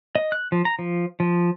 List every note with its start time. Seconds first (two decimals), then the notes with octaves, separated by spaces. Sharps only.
0.15 D#5
0.32 F#6
0.52 F3
0.65 A#5
0.79 F3
1.20 F3